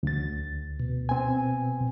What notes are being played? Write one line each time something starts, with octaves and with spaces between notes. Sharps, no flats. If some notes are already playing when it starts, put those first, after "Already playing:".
D2 A6
B2
C4 G#5